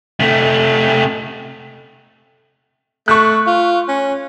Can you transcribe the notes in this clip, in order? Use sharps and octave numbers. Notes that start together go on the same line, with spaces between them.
C3 A3
A3 C#6 F#6
F4
C#4